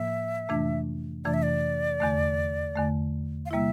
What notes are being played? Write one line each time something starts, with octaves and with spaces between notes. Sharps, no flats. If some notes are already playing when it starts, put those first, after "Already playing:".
Already playing: A2 F3 A#3 E5
F2 C3 E3 A3 D4
F2 C3 E3 A3 D4 D5
E5
D5
E2 D3 A3
E2 D3 A3
F5
C3 G3 A#3 E4 E5